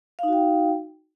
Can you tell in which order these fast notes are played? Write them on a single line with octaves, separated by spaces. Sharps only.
F5 D#4 F#4 G5